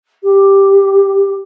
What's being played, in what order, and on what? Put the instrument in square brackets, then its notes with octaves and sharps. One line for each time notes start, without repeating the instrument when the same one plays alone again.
[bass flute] G4